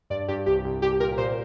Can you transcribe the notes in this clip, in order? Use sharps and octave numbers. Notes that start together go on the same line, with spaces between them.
G2 D5
G2 G4
C2 G4
C2
C2 G4
A#2 A#4
A#2 C5